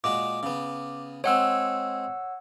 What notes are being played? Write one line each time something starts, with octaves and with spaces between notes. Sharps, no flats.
A#2 G#3 F#4 D6
C#3 B3
G#3 C4 C#5 F#5 E6